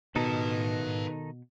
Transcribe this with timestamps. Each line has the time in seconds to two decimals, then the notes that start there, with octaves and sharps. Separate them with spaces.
0.16 B2 D#3 D#4 A4 B4 A5